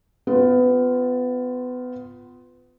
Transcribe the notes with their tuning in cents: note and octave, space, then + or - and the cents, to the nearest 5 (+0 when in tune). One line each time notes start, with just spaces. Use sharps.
B3 +25 F4 +0